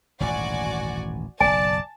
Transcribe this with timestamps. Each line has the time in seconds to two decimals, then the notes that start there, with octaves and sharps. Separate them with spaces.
0.20 D#1 A1 G#2 F#4 D5 G#5
1.40 F#1 B1 D5 G#5 A5